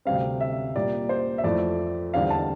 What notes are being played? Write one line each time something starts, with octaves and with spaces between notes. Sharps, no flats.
D2 C3 G3 C4 F5
E5
A#2 G3 A#3 D5
C5
E5
F2 E3 A3 D5
E2 D3 G3 C4 F5
A5